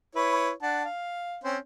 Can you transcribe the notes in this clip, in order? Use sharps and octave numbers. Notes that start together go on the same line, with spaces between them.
E4 B4 C#5
D4 F#5 A5
F5
C4 C#4 C5